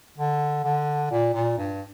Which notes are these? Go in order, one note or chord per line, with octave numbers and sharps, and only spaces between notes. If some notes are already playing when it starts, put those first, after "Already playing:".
D3
D3
A#2
A#2
G2